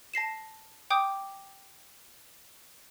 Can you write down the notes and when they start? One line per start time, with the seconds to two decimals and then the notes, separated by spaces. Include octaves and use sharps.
0.14 A5 A#6 C7 E7
0.90 G5 D6 D#6 G6